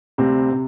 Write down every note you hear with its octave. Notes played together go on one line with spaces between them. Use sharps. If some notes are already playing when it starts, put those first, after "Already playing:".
D2 C3 G3 C4
C3